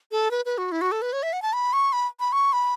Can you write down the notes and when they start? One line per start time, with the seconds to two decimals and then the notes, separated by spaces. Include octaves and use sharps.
0.12 A4
0.31 B4
0.45 B4
0.58 F#4
0.72 E4
0.81 F#4
0.92 A4
1.02 B4
1.13 C#5
1.23 E5
1.33 F#5
1.42 A5
1.53 B5
1.73 C#6
1.93 B5
2.20 B5
2.32 C#6
2.53 B5